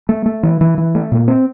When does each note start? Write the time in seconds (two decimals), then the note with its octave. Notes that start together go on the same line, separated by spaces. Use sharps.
0.09 A3
0.26 A3
0.43 E3
0.61 E3
0.78 E3
0.95 A3
1.12 A#2
1.28 C4